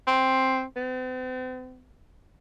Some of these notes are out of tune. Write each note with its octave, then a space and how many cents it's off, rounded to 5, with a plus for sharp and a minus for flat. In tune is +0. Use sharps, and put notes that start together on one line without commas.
C4 +5
C4 -45